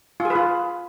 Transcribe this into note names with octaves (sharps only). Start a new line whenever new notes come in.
F4
G#4
B4
F4